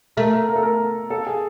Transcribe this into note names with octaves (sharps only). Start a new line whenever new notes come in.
A3 A#4
A#4
A#4
A4
A#4
A4
G#4